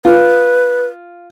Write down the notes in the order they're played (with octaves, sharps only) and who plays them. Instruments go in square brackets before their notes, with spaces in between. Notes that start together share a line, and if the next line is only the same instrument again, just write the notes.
[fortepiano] F4 [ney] B4